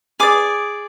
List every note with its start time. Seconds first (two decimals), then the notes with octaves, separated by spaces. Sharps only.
0.20 G#4 D5 D6